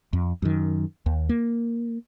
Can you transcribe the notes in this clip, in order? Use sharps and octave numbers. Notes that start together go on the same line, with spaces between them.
F2
F#2 D#3
D#2
A#3